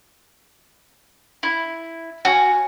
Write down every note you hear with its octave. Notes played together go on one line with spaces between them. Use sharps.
E4
F#4 C#5 F5 G#5